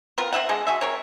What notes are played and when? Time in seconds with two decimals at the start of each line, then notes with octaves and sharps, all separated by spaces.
0.18 B3 C4 F4 A#4
0.33 C4 E4 E5 F#5
0.49 D3 G#3 D#5
0.67 G#3 F#4 E5
0.81 C3 A#4 C#5